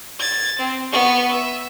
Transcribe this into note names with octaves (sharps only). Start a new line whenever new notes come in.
G#6 A6
C4
B3 C#6
E5